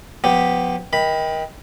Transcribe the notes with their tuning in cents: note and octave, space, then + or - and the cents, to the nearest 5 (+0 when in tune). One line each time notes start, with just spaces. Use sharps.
F3 +35 B3 +10 G4 +0
D#3 +25 B5 +0